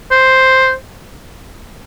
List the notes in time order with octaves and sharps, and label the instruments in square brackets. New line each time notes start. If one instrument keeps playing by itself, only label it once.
[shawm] C5